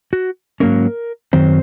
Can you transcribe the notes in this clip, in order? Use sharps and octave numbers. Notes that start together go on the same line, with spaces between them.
F#4
G#2 F#3 A#3 C#4 A#4
F#2 D#3 F#3 C4 C5